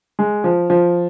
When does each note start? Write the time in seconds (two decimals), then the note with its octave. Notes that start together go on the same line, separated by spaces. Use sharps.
0.19 G#3
0.44 F3
0.70 F3